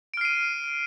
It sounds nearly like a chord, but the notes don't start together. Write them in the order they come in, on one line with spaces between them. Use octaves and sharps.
D7 F6 C7 D#7